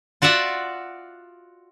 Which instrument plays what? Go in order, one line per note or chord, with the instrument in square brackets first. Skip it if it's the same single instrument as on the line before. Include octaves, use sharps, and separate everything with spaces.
[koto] F4 F#4 D5 E5 F#5